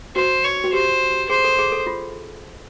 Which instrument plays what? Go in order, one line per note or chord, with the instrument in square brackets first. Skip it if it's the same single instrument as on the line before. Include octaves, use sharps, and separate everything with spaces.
[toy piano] F#4 [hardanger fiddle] C5
[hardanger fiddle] C#5
[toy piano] F#4
[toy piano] G4 [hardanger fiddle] C5
[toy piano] G#4 [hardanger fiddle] C5
[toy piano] A4
G#4
A4
F4